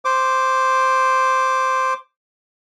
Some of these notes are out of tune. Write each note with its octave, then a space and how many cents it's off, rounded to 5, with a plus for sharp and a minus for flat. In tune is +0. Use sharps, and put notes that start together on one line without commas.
C5 +0 D6 +0